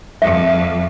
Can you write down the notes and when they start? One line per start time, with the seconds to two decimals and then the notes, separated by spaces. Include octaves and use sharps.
0.22 F2 E5